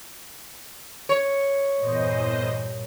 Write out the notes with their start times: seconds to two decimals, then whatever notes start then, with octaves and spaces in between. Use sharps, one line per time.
1.09 C#5
1.80 E2 G2 A#2 C5 D#5